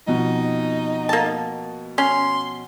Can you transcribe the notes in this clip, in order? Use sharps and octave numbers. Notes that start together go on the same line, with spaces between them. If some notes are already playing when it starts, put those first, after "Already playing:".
F2 B2 D#4
A#3 A5
C#4 C6